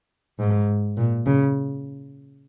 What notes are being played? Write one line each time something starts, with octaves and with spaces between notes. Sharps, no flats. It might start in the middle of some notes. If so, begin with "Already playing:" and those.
G#2
A#2
C#3